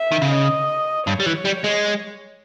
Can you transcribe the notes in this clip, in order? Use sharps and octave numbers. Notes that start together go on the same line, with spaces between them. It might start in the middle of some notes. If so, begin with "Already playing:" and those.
Already playing: E5
D#3
C#3
D#5
G2 C#5
G3
E3
G3
G#3